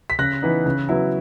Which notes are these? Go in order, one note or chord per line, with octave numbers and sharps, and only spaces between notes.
B6
C#3 F#6 A#6
E3 B3 D#4
C#3
F#3 B3 E4